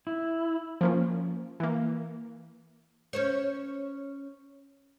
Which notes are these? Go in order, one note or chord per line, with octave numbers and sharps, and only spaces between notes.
E4
F3 A#3 C#4
E3 A#3
C#4 C5 C#5